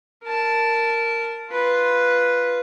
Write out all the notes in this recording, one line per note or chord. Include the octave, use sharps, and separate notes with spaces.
A#4 A5
F4 B4